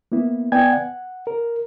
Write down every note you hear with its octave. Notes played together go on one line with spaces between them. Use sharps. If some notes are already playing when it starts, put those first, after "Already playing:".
A#3 B3 E4
B3 D5 G5 G#5 G#6
F#5
A#4